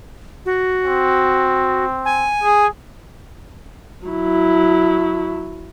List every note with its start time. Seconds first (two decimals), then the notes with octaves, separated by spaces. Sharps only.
0.46 F#4
0.85 C4
2.05 G#5
2.43 G#4
4.06 F#3 E4